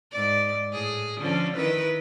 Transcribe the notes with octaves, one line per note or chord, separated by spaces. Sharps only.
G#2 D5
A2 G#4
D3 F3 C#4
D#3 E4 B4